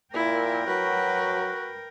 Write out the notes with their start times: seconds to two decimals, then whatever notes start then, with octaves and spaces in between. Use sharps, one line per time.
0.14 A#2 E4 A#4 G5
0.67 F#3 F#4 B4